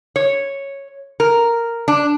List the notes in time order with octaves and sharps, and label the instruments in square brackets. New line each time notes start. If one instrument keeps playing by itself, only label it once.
[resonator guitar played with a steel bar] C#5
A#4
D4